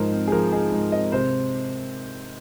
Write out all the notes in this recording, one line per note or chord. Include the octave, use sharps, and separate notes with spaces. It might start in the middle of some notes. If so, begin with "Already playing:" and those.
Already playing: G#2 F3 D#4 A#4 C5
C4
G#4
F3 A#4
D#4 G#4
G#2
C4 D#5
C3 C5